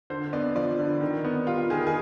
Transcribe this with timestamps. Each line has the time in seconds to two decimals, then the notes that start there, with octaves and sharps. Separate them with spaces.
0.10 D3 C5
0.33 B3 D5
0.55 F3 D5
0.79 D3
1.01 D#3
1.25 B3
1.47 G3 F4
1.70 D#3 G#4
1.87 G#4